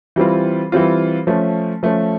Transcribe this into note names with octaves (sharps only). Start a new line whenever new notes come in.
E3 G3 C4 F4
E3 G3 C4 F4
F3 A3 C#4
F3 A3 C#4